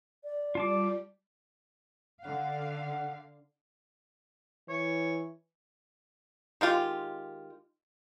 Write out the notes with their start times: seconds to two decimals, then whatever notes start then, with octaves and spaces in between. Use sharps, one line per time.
0.24 D5
0.55 G3 F4 A5 D6
2.22 D3 F5 F#5
4.69 E3 C#5
6.61 D#3 G#3 F4 G4